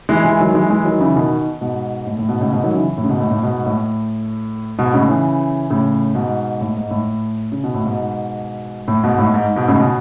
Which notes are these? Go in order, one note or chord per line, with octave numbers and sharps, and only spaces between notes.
E3 G#3
E3 G#3
D#3 F#3
E3 G#3
E3 G#3
D#3 F#3
C#3 E3
B2 D#3
G#2 B2
A2
A2
G#2 B2
A2 C#3
G#2 B2
D#3 F#3
C#3 E3
A2
C#3
G#2 B2
A2
A2
G#2 B2
A2
G#2 B2
A2 C#3
C#3 E3
A2 C#3
G#2 B2
A2
G#2
A2
C#3
B2
A2
G#2 B2
A2
G#2 B2
A2
G#2
G#2 B2
A2 C#3
B2